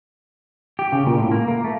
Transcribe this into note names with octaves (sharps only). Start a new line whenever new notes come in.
G4
C#3
A#2
A2
A#3
A#3
A3